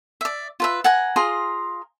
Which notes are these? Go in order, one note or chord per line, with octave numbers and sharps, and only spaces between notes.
D5 E5
F4 B4 E5
F#5 G#5 A#5
F4 G#4 A#5 C6